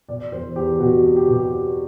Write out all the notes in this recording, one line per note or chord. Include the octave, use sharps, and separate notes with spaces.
B2 D5
E2 C5
E2 G4
B2 F#4
G4
C4
G4
B2
G4